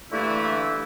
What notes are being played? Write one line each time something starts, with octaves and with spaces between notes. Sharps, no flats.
G2 D3 E3 A3 A#3 E4